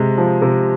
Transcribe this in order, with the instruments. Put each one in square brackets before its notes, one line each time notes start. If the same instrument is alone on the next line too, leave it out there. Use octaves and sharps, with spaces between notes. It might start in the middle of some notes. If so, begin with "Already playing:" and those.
Already playing: [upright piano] C3 G#3
F3
C3